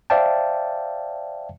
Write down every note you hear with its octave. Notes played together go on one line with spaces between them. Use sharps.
C5 D5 E5 F5 G5 A5